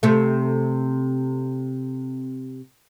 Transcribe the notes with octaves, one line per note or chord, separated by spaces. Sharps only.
C3 A3